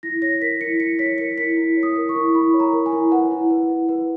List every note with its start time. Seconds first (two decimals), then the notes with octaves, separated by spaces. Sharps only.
0.03 E4 A#6
0.22 C#5 A#6
0.41 A#4 B6
0.61 E4 C#7
0.80 E4 C#7
0.99 C#5 B6
1.18 A#4 C#7
1.38 E4 B6
1.57 E4
1.77 C#5
1.83 D#6
1.96 A#4
2.09 C#6
2.15 E4
2.34 E4 B5
2.54 C#5
2.60 A#5
2.73 A#4
2.86 G#5
2.92 E4
3.11 B4 F#5
3.31 E4
3.50 B4
3.69 E4
3.89 B4